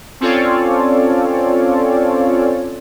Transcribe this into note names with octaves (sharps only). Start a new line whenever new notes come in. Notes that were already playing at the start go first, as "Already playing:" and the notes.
C4 C#4 F4 A4 C#5 D5